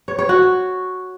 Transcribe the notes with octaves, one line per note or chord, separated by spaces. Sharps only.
C#5
C#5
F#4